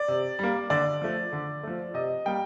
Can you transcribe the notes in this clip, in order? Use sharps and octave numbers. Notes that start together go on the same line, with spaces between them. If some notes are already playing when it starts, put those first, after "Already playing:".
Already playing: D5
C3
G3 A#3
D3 D5
F3 A3
D3
F3 A3
C3 D#5
G3 A#3 G5